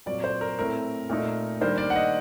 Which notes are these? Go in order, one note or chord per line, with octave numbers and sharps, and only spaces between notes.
A#2 F#3 C4 D5
C5
A#4
A2 A3 C4 A#4
A#2 A3 D#4
D#3 G3 A#3 D4 C5
D5
F#5
D#5